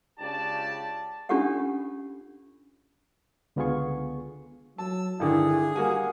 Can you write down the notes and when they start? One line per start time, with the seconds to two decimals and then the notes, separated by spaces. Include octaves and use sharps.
0.20 C#2 C#3 D4 G4 D5 A5
1.29 C#4 D4 F4 G4 A4 F#5
3.56 C#2 D3 B3 F4 G#4 C#6
4.78 F#3 A5 E6
5.20 G2 D3 D#3 E4 G#4
5.76 G3 A#3 F#4 G#5